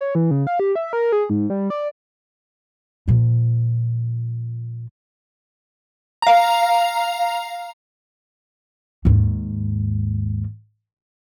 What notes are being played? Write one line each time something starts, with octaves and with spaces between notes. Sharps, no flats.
C#5
E3
C#3
F5
G4
E5
A#4
G#4
G#2
G3
D5
A#2 F3
F5 A#5
D#2 G#2